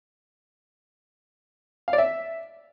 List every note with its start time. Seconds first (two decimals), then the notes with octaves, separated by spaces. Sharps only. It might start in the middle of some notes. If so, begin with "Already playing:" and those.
1.88 F5
1.93 D5
1.98 E5